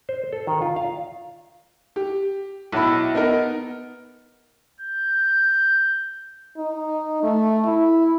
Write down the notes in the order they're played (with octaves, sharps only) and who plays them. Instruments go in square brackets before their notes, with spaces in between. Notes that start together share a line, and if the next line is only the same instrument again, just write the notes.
[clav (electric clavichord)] C5
A4
D#3
F4
F5
[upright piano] G4
B1 E4 B5
B3 D#4 A#4
[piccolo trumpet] G6
[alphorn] D#4
A3
E4